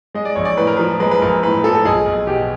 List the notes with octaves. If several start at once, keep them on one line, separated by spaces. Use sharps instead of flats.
G#3 D#5
D5
A#1 C#5
D5
A2 B4
A#4
F3 B4
G#3 B4
B4
A#1 A#4
A2 B4
F3 A4
A4
B1 G#4
B1
B2 G4